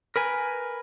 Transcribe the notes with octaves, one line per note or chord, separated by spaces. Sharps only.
A#4 B4 G#5